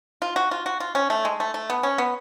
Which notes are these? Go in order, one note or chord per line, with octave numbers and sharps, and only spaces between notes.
F4
F#4
F4
F#4
F4
C#4
A3
G#3
A3
A3
B3
C#4
B3